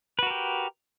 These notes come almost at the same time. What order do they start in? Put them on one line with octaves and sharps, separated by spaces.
B4 F#4 A#4 G4